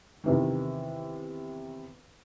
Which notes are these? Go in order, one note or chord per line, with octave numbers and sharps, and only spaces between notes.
E2 C3 D#3